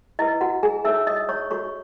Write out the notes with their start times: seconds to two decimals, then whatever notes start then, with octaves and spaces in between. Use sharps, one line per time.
0.19 E4 B4 D#5
0.41 F#4 F#5
0.63 G#4 G#5
0.85 D#4 A4 C#5 E5 E6
1.07 D#5 D#6
1.29 C#5 C#6
1.51 F#4 A4 C#5 C#6